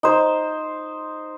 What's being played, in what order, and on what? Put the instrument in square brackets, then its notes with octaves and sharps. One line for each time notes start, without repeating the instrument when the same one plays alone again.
[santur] D#4 C5